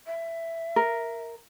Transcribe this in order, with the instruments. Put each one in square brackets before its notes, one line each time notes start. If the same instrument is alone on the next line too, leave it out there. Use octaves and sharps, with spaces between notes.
[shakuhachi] E5
[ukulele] A#4